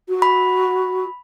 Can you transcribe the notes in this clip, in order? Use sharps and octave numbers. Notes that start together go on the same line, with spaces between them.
F#4
B5